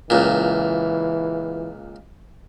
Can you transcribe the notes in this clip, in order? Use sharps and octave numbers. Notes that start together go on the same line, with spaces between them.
C#2 A#2 E3